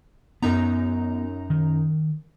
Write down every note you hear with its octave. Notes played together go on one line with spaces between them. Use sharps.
F#2 B3 D#4 A#5
D#3